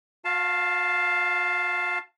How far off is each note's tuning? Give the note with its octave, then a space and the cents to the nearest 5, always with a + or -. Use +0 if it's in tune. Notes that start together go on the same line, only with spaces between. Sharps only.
F#4 -45 F5 +0 A5 +0